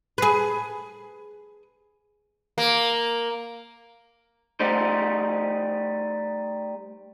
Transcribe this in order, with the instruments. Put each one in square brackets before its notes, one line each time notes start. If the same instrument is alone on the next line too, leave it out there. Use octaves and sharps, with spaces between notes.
[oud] G#4 B4
[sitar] A#3
[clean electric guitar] G3 A3 D#4 C5